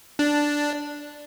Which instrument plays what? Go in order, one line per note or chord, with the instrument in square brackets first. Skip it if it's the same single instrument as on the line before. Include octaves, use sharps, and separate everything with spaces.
[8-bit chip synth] D4